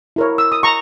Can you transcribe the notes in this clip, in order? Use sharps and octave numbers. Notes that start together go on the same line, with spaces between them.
E4 A#4 C#5
E6
D#6
A#5 C#6